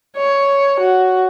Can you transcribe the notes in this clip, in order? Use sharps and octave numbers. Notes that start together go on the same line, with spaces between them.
C#5
F#4